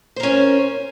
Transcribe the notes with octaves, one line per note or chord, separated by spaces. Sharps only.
C#4 A#4 C5